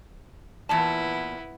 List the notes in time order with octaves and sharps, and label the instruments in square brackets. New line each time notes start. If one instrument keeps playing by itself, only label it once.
[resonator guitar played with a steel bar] E2 A#2 A5 [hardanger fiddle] B3 E4